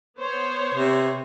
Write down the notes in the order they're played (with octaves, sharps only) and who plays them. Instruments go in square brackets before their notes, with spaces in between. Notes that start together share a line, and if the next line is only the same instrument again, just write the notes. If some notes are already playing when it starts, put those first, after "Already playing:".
[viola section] B3 C5 C#5
[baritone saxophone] C3